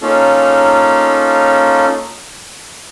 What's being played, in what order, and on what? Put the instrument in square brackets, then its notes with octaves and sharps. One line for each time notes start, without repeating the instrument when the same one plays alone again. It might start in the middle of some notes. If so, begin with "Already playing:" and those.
[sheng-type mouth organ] A#3 C#4 D#4 F4 A4